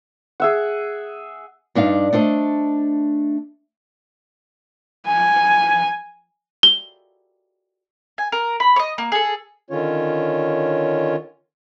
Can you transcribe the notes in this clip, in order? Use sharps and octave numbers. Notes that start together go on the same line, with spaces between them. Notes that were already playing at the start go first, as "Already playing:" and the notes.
G#4 E5 F#5
G2 D4 D#4 F5
A3 D4 C5 D#5
G#5
G7
G#5
A#4
B5
C#5 D#5
A#3
G#4 A4
D3 D#3 C#4 F4 C#5